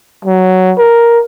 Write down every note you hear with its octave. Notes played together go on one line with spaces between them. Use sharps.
F#3
A#4